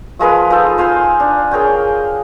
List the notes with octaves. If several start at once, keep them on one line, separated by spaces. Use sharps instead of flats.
F3 G#3 A#4 B4
D#4 F4 A4
C5 F5 G#5 C6
D4
G#4 A#4 C#5 G5